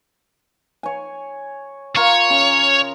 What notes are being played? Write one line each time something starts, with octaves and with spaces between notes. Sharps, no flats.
C#5 G#5
F4 A#4 C#5
C#3